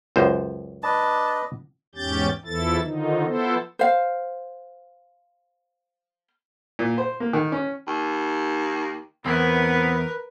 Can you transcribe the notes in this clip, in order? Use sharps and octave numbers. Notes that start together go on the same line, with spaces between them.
C#2 F#2 C5
D4 B4 D#5 A5
E2 G#2 C#4 G4 G6 A6
E2 E3 F3 E4 A4 A6
D3 D#3 F3 D#4
F3 B3 E4 A4 C5
C5 F5
A#2
C5
A#3
D#3
C#4
D#2
E2 B3 C4 E4 A#4 B4